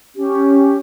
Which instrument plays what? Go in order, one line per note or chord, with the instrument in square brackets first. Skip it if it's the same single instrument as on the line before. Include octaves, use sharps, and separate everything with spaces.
[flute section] C#4 G4